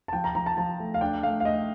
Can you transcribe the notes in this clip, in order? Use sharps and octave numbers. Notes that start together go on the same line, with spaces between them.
A5
F3 G5
A#5
F3 A#5
A5
F3 A5
A3
F5
D4 G5
A3 F5
F5
A3 D#5